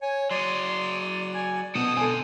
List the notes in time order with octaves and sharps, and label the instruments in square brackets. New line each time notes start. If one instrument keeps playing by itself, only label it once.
[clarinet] C#5 [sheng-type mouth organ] G#5
[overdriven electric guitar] F#3 G#4 [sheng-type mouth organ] D5 [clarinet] C6
[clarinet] G#5
[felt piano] B2 [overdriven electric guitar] C4 A4 [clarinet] D#6
[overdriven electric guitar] D3 C4 [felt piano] A4 G#5